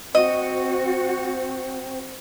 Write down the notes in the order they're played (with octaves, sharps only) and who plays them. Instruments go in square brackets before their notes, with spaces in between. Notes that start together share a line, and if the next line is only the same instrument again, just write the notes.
[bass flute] C4 [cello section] F#4 [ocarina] C5 [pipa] D#5